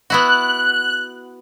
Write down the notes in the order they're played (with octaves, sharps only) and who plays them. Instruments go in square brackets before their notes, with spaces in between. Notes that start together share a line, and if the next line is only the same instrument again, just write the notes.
[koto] B3 E4 F#4 [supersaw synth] F#6